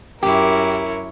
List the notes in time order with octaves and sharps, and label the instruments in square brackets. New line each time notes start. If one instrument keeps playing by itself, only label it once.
[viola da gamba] F#2 E4 C#5 [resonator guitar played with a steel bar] G4 [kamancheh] A#4